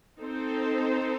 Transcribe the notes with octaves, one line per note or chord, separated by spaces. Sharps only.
C4 D#4 A4 C5